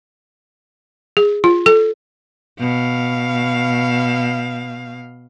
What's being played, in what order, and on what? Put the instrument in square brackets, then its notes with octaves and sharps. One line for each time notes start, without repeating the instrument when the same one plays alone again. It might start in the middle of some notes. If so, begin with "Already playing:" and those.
[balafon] G#4
F4
A4
[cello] B2 F5